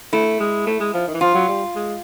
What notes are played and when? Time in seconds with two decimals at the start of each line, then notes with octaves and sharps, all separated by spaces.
0.13 A3 E4
0.40 G#3
0.67 A3
0.80 G#3
0.94 F3
1.08 D#3
1.14 E3
1.21 F3 F4
1.35 F#3
1.48 G3
1.75 G#3